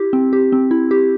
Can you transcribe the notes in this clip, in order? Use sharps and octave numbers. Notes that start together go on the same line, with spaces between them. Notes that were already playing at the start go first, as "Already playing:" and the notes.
Already playing: E4 G4
C4
G4
C4
E4
G4